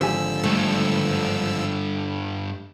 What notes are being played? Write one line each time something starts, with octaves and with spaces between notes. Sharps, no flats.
G#1 D3 F3 G4 G#5 E6
G2 A3 A4